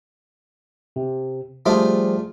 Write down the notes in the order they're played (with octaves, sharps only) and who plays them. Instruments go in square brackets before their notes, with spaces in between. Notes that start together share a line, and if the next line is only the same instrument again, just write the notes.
[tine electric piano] C3
[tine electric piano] F3 G3 G#4 [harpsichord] A3 D4 F4